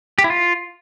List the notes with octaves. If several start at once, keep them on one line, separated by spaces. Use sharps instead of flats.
G4
E4
F4